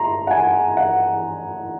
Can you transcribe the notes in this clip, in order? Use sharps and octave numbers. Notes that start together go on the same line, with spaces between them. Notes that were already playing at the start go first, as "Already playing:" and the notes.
Already playing: A#5 C6
F#5
G#5
F#5